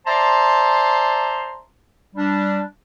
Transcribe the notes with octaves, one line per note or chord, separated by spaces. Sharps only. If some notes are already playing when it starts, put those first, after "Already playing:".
C5 D5 E5 A5 A#5 C6
G3 D4